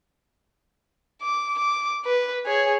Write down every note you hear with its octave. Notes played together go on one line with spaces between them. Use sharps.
D6
D6
B4
G#4 C#5